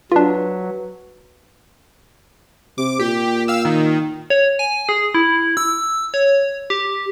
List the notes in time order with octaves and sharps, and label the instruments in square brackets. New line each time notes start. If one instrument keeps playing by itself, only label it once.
[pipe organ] F#3 [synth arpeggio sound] D4 F4 [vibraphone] B4
[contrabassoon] C3 [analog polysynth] D6
[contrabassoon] A#2 [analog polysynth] G4
[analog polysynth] F5 E6
D#3
[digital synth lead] C#5
G#5
G#4
E4
E6
C#5
G4